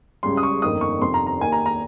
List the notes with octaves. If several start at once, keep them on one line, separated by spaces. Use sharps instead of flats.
C#2 C#3 G3 C6
D#6
C#6
G1 F2 D#3 A#3 D#4 D#6
C#6
F2 C3 D#3 C6
A#5
A#5
D#2 D#3 A#3 D#4 G#5
A#5
A#5